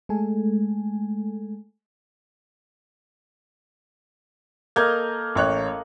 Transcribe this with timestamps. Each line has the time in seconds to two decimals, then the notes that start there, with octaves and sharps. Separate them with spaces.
0.09 G#3 A3 A4 G#5
4.76 A#3 A4 D#5 F6 G6 G#6
5.35 A1 C#5 F#6